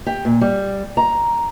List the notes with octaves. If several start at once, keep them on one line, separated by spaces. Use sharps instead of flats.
G4
A#2
G3
A#5